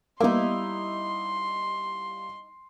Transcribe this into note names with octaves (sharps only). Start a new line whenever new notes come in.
G3 A#3 B3 D#4 E4 F5 C6 D6